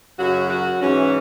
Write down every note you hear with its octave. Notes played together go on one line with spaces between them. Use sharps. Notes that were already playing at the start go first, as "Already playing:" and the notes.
F#2 C#3 F#3 F#4
F#4
G#2 E3 C#4